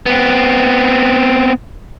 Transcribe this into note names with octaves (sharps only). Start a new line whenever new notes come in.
B3 C4